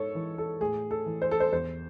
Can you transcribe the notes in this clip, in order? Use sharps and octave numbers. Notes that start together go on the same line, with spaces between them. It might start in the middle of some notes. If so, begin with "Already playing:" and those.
Already playing: G#2 A4 C#5
E3
A4
A2 G#4
A4
E3
C5
A4
C5
E2 C5